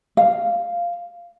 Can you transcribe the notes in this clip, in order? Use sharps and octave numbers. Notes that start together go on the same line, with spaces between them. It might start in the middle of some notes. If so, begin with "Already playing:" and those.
F5